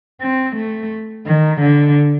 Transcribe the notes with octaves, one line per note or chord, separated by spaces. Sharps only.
C4
A3
D#3
D3